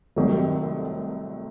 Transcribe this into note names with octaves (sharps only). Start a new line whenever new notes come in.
C2 C3 D#3 F#3 A3